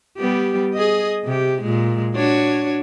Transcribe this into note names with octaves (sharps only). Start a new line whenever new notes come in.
G3 B3 G4
G#4 D#5
C3 G4
A#2 G#3
D4 F#4 C#5